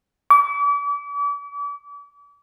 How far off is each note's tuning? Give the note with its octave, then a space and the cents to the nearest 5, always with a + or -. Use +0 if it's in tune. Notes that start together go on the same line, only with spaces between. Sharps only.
D6 -40